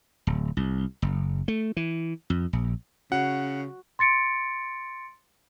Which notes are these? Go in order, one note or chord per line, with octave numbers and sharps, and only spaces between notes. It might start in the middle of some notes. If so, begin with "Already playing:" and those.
D1
C2
F#1
A3
E3
F2
A#1
C#3 F#4 F#5
C6 A6 C#7 D7